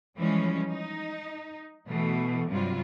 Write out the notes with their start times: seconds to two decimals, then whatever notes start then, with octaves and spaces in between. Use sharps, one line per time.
0.18 E3 F3 G3 G#3 C#4
0.67 D#4
1.88 B2 E3 A3
2.48 G2 C3 F#3 G3 F4